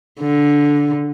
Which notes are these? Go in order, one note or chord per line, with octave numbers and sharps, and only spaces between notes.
D3